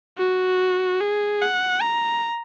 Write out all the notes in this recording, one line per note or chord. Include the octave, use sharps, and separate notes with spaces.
F#4
G#4
F#5
A#5